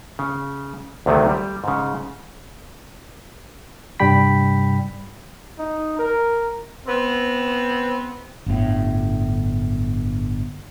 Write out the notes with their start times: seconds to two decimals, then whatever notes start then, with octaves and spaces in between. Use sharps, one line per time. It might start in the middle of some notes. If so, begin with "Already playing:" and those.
0.19 C#3
1.06 D2 C3 D#3 F#3 A3
1.29 G3
1.64 G#2 C#3
4.00 G2 C3 G3 G5 B5 B6
5.59 D#4
5.99 A#4
6.87 B3 C4
8.46 G1 A2